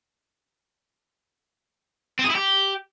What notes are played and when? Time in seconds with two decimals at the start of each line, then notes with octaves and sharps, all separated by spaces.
2.19 C4
2.24 G#4
2.30 E4
2.35 G4